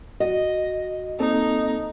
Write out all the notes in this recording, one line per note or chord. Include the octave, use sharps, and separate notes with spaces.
F#4 D#5
A#3 C4 D#4 A4